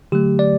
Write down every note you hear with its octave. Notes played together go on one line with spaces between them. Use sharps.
D3 F#3 A3 G4
D5